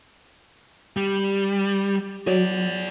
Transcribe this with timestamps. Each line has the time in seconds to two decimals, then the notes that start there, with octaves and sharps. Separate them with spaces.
0.97 G3
2.27 F#3 G#4 D5